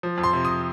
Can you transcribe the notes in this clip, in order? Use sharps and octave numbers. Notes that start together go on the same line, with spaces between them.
F3
F2
C6
C3
D#6